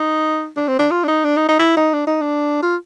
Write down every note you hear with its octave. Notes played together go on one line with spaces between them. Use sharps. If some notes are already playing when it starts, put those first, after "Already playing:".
Already playing: D#4
D4
C4
D4
F4
D4
D#4
D4
D#4
D#4
E4
D#4
D4
D#4
D4
F4